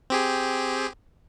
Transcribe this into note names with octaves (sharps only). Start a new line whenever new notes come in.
C4 G4 G#4